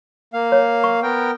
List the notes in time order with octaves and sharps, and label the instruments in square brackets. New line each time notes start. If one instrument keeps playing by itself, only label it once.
[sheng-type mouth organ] A#3 F5
[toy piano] C#5
C#6
[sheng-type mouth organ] B3 A#4 G5